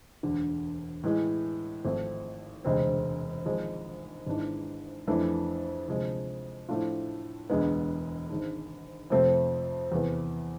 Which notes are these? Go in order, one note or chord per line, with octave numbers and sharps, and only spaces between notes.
E1 D2 D3
A2 E3 G#3
G#1 G#2 F3 A3 C4
E1 D2 C3 G#3 C4
G#1 G#2 F3 G#3
G#1 G#2 E3 G#3 D4
F2 E3 A3 D4
D2 C3 F3 G#3
A2 F3 A3 D4 F4
E1 D2 D3 G#3 B3
G#1 G#2 G#3 D4
F2 C3 F3 A3 C4
E2 C3 E3 B3